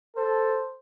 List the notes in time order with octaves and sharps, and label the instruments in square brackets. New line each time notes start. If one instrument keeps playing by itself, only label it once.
[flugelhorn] A4 [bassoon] C5